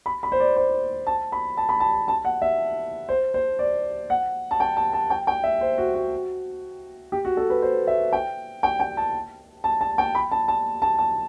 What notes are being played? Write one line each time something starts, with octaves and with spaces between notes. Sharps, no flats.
B5
B5
C5
D5
C5
A5
B5
A5
B5
A5
A5
F#5
E5
C5
C5
D5
F#5
A5
G5
A5
A5
G5
G5
E5
C5
F#4
F#4
G4
F#4
A4
B4
C5
E5
G5
G5
G5
A5
A5
A5
G5
B5
A5
A5
A5
A5